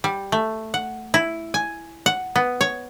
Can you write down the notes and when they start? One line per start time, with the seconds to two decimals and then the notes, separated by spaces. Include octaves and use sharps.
0.04 G3
0.32 A3
0.74 F#5
1.14 E4
1.54 G#5
2.06 F#5
2.36 B3
2.61 C#5